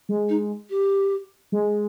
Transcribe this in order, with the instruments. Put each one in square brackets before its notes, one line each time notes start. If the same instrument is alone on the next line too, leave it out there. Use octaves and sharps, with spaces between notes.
[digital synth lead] G#3
[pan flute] D#4
G4
[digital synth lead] G#3